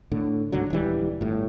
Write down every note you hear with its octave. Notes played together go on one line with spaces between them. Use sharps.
A2 D3
C#2 G#2 D3 F#3
D#1 C#2 E3 G3
G1 A2